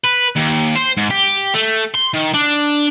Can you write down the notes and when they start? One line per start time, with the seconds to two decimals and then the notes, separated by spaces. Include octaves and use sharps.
0.04 B4
0.36 D#2
0.76 C5
0.97 G#2
1.11 G4
1.54 A3
1.95 C6
2.14 D#3
2.34 D4